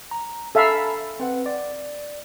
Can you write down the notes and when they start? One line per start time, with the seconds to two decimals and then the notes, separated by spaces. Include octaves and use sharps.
0.11 A#5
0.55 A4 E5 F5 G#5 A#5 B5
1.20 C4 B4 F#5
1.46 D5